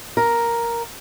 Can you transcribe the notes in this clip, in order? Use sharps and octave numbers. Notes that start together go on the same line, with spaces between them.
A#4